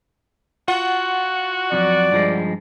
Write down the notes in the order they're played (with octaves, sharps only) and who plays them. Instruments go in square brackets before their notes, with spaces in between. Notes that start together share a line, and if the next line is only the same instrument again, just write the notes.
[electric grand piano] F4 F#5 [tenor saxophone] F#4
[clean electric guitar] F2 E3 F#3 [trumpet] D5
[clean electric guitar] G2 F3 G#3